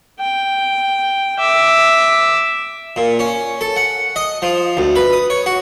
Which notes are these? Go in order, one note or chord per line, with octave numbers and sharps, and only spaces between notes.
G5
E5 D6
A#2
C#4
A4
F#5
D#5
F3
D2
B4
D#6
C#5
F#4